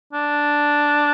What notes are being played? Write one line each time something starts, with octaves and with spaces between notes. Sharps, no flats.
D4